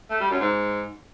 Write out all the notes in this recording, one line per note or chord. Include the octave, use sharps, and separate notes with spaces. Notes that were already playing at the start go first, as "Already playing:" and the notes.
A3
G3
F#2
G#2